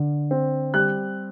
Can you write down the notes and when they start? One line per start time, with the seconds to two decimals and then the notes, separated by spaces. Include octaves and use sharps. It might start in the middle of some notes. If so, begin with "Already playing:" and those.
Already playing: D3
0.31 C4
0.74 G3 F#6